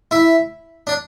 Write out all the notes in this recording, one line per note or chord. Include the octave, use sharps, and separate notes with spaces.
E4
D4